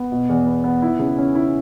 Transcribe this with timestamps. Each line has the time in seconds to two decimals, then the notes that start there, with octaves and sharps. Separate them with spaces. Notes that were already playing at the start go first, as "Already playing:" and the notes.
Already playing: B3
0.12 B2
0.29 E2
0.46 B3
0.64 B3
0.82 E4
0.99 C#3
1.18 C#4
1.35 E4